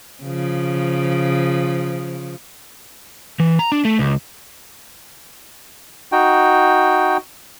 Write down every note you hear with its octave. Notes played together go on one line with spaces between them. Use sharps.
C#3 F3
E3
A#5
D4
A3
C#2
D#4 F#4 G5